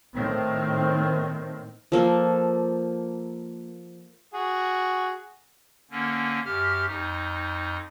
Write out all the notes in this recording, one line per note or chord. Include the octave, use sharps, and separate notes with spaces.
A2 D#3 C4
F3 A#3 A4
F#4 G#4
D3 A#3 C#4
F#2 G4 F6
F2 D#4